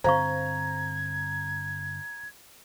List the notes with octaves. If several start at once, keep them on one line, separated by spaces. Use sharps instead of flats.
G2 D3 C4 C5 F5 A#5 C#6 G#6